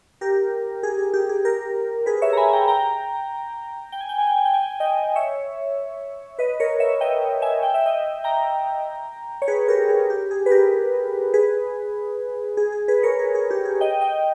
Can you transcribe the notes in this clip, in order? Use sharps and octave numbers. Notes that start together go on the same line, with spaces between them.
G4 A#4
G#4
G#4
G4
G#4
G4 A#4
G#4 B4
C#5 E5
A#5
G#5 B5
G5 A#5
G5 A#5
G5
G#5
G5
G#5
G5
G#5
G5
G#5
G5
G#5
D#5 G5
C#5 E5
B4 D#5
A#4 C#5
C#5 E5
D#5 G5
E5 G#5
G5
E5
D#5 G5
G5 A#5
C#5
G#4 B4
G4 A#4
G#4
G4
G#4
B4
G4 A#4
G#4 B4
G#4
G#4
G#4 B4
A#4 C#5
G#4
G#4
G4
G#4
D#5 G5
D#5 G5